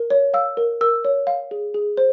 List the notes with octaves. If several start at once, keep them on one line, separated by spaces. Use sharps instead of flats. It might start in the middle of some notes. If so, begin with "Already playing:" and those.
Already playing: A#4
C#5
F5 E6
A#4
A#4 E6
C#5
F5
G#4
G#4
C5